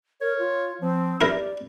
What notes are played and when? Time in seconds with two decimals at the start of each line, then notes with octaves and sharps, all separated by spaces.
0.21 A#4 C#5
0.39 F4
0.81 F3 C4
1.21 E4 G4 A#4 D5